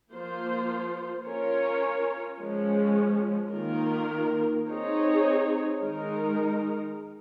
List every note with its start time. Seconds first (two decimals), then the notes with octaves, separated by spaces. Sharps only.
0.12 F3 A#3 F4 C5
1.25 C#4 F4 A#4 C#5
2.39 F3 G#3 C#4
3.52 D#3 A#3 F4 A#4
4.66 C4 D#4 G#4 C#5
5.80 D#3 G#3 D#4 A#4